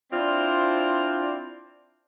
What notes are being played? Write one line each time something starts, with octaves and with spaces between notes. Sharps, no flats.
C4 D4 E4 F4 C5 D5